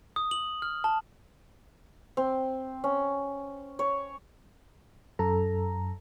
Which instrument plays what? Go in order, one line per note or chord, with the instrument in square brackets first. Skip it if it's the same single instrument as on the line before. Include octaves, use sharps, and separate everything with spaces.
[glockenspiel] D#6
F#7
F6
A5
[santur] C4
C#4
C#5
[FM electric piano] F#2 A4 A#5